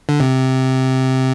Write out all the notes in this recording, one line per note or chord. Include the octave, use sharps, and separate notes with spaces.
D3
C3